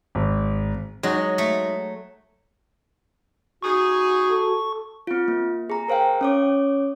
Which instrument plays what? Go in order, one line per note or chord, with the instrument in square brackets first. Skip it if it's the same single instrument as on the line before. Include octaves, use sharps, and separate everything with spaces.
[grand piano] G#1
[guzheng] F#3 [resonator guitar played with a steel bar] G#3 D#4 F#4
[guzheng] A3
[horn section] D#4 G#4 [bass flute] F#4 [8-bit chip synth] C#6
[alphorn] A4
[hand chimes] C4 F4
A#3
G#4 A#5
A#4 C5 F5 G5
C#4 C#5 D6